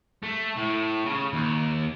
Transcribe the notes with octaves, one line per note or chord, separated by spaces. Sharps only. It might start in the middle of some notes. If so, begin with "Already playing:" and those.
A3
A2
C#3
D#2